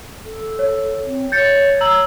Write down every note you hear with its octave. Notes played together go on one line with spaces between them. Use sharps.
A4
C#5
C4
C#5 G6 A6 C#7
A#5 E6 F#7